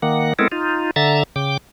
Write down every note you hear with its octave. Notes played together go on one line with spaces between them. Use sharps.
D#3 A#3 F#5
G#3 B3 C4 E4 A4 A#4
D#4 F4
D3 E5 A#5 A6
C#3 G5 D6